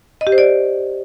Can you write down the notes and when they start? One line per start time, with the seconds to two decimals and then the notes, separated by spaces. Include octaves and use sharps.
0.21 D#5
0.27 G4
0.32 C5
0.38 D5